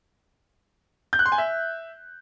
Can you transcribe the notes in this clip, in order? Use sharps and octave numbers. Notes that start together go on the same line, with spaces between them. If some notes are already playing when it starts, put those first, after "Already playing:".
G6
F#6
C6
G#5
E5